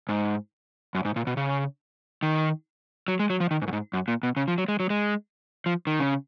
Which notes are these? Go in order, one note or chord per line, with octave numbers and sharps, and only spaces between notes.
G#2
F#2
G#2
A#2
B2
C#3
D#3
F#3
G#3
F#3
F3
D#3
G#2
F#2
G#2
F#2
A#2
B2
C#3
F3
F#3
G#3
F#3
G#3
F3
D#3
C#3